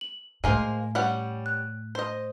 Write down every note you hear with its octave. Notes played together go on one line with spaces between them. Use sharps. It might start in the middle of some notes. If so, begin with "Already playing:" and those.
F#7
A2 G#3 A#3 C5 G#5
G3 C#4 F#5
F#6
C5 D#5